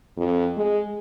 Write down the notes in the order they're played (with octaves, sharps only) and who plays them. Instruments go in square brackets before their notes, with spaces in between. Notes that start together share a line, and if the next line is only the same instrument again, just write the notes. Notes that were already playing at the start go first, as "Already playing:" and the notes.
[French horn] F2
G#3